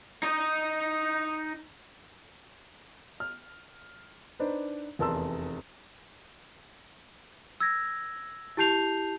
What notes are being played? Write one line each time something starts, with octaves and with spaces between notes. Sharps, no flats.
D#4 D#5
F6
D4 D#4 B4 C5
F1 E2 A#4 A5 C6 E6
E6 G#6 A#6
E4 G4 A5 G6 C7 F7